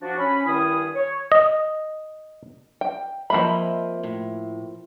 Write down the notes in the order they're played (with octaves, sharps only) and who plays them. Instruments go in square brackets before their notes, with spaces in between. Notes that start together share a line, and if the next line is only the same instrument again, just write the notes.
[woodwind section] F3 D4 F#4
C#4 B5
G2 D#3 E4 G#4 G#5 D#6
C#5
[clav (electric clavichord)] D#5
[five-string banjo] G5
[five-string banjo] F3 A#3 B5 [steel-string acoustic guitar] C4 D#5 E5
[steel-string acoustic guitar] A2